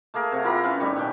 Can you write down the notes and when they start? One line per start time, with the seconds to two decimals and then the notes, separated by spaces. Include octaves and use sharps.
0.14 A3 A#3 G#4 A#4
0.32 C3 C#5 F#5
0.44 E4 F4 G4 A#4
0.64 C#4 E4 B4
0.80 A2 D#3 G3 C#6
0.96 B2 C#4 G5 C6